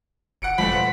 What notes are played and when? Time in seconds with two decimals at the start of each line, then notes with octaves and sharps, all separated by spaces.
0.42 F#1 F#5 C#7 D7
0.58 F2 G#3 A3 B5
0.72 B2 C5 F#5